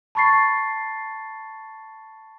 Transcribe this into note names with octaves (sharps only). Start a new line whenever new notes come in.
A5 B5 C#6 A6 C7